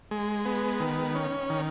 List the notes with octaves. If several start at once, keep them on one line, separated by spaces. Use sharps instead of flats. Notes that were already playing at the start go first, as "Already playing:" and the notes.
G#3
B3
D#3
C#4
D#3